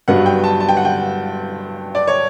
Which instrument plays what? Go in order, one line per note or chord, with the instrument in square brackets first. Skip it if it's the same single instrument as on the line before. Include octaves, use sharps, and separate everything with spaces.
[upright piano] G2 F#3 B3 F#5
G5
A5
A5
G5
F#5
G5
D5
C#5